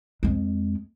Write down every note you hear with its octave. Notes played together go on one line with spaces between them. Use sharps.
F2 G#3